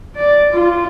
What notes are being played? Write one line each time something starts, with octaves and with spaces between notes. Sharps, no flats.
D5
F4